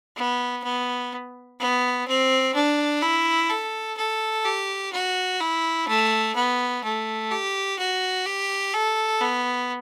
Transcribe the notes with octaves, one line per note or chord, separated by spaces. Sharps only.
B3
B3
B3
C4
D4
E4
A4
A4
G4
F#4
E4
A3
B3
A3
G4
F#4
G4
A4
B3